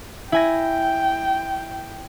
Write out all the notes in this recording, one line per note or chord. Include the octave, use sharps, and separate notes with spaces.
E4 G5 G#5 A#6